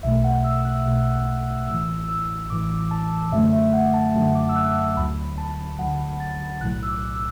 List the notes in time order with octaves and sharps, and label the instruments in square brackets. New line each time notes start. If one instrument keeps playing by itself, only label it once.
[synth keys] B1 B2 A3 E5
F#5
E6
F#6
B1 B2 A3
A1 A2 E3 E6
E6
A1 A2 E3 D6
A5
F#2 D3 F#3 A3 E5
E5
F#5
A5
F#2 D3 F#3 A3
D6
E6
F#6
D2 D3 F#3 B5
A5
D2 D3 F#3 F#5
A6
B1 A2 F#3 F#6
E6
D6
E6